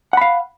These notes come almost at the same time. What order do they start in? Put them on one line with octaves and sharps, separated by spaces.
F#5 B5 F5